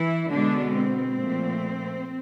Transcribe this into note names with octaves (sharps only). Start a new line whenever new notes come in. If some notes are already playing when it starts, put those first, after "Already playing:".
Already playing: E3 E4
B2 D3 G#3 B3 D4
C4
A#2 F3 A3